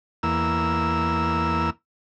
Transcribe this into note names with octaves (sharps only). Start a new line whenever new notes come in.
E2 A#3 E6